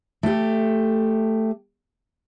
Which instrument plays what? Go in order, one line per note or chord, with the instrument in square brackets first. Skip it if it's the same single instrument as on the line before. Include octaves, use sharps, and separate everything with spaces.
[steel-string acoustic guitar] A3 G4